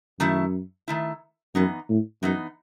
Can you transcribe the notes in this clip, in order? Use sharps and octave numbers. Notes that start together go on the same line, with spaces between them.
F#2 D#3 A3 E4
D#3 A3 E4
F#2 E3 B3 D#4
A2
F#2 E3 B3 D#4